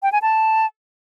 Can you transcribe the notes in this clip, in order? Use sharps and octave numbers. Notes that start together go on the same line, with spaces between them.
G5
G#5
A5